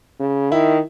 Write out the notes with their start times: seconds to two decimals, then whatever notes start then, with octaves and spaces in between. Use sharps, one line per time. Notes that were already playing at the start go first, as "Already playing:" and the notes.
0.20 C#3
0.51 D#3 E4